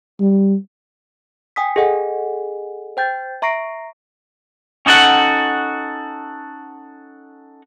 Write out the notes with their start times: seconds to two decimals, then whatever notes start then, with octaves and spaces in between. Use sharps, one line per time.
0.20 G3
1.56 G5 G#5 D#6 B6
1.76 G#4 A4 D#5 F#5 G#5
2.97 C5 G5 G6 A6
3.42 E5 A#5 C#6 A#6 C7 D7
4.86 C#4 D#4 F#4 A4 F#5